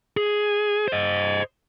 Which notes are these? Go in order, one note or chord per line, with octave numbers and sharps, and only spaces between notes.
G#4
C5 D#5